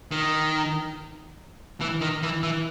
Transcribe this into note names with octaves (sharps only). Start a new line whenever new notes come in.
D#3
E3
D#3
E3
E3